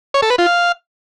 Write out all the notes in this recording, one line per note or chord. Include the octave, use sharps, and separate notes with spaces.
C#5
A4
B4
F4
F5